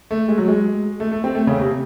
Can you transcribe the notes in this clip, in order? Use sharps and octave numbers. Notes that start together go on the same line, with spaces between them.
A3
G#3
F#3
G#3
A3
A3
C4
A3
C#3
C3